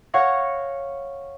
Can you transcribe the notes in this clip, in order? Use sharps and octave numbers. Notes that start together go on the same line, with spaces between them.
C#5 F5 F#5 C#6 A#6